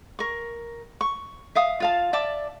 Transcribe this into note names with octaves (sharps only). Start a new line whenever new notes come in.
A#4 C#6
C#6
E5 F5 D#6
F4 F5 A5
D5 E5 A5 D6